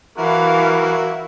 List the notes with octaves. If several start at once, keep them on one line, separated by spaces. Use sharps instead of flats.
E3 E4 F#4 A#4 F5